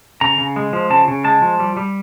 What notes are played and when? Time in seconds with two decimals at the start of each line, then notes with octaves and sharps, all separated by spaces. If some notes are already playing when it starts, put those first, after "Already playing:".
0.21 C#3 A#5
0.38 C#3
0.56 G#3
0.73 F3
0.90 C#3 A5
1.08 C#3
1.24 G#3 A5
1.42 F3
1.60 G3
1.77 G3